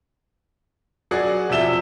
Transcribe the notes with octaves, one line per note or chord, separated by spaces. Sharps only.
F#3 F#4 G#4 D5 F#5
E2 C3 F3 E5 E7 G7